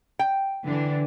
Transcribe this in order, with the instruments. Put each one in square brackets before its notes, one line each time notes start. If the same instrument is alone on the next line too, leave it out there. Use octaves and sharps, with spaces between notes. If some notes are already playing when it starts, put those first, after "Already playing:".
[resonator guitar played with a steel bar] G5
[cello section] D3 E3 D4